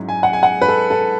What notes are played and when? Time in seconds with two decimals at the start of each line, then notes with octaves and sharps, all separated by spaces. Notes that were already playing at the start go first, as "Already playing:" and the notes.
Already playing: G#2 F#3 C#4 E4
0.09 G#5
0.23 F#5
0.33 G#5
0.43 F#5
0.62 B4
0.68 A4
0.91 A4